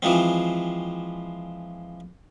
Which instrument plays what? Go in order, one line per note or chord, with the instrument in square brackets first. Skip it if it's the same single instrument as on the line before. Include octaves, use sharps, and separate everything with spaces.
[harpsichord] E3 F3 G#3 C4